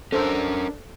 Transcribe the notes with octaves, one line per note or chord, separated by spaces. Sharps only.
C#4 D4 A4 A#4 C5